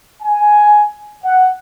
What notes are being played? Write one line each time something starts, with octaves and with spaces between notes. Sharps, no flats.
G#5
F#5